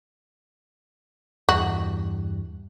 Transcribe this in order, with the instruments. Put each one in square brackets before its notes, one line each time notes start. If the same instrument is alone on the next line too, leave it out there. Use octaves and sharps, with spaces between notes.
[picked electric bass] E2 G2 [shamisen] F#4